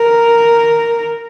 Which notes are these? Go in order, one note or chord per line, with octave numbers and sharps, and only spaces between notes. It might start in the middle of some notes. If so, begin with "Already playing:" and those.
Already playing: A#4